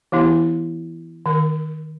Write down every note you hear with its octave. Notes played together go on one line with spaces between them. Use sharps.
E3 B3 E4 G4
D#3 A#4